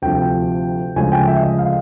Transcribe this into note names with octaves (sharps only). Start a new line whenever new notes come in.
D2 C3 F3 G5
D2 C#3 F3 G#3 G#5
G5
E5
D#5
F5